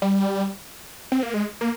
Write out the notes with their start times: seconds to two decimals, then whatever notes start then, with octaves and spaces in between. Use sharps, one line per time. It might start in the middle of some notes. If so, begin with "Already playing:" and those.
0.02 G3
1.12 C4
1.23 A#3
1.34 G#3
1.61 A#3